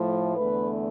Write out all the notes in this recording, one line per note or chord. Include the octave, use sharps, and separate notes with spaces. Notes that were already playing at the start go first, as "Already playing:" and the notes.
Already playing: A2 F3 A3
E2 D3 A3 B4